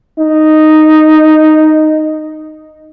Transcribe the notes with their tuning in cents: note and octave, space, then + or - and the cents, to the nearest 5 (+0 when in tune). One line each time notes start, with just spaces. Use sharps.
D#4 -5